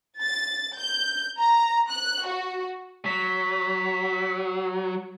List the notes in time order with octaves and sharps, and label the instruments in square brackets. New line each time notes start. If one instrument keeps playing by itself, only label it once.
[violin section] A6
G6
A#5
F#6
F#4
[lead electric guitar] F#3 [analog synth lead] B6